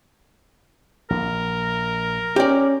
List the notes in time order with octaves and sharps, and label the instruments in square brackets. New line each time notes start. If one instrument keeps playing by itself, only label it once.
[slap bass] A#1 [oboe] A#4
[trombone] C#4 [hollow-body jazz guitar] G4 D5